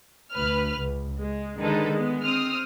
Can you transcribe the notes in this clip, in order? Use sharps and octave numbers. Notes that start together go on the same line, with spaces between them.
D2 B4 F6
C#2
G#3
D3 D#3 G#3 D#4 A4 B4
G#3 B3
C4 D#6 F6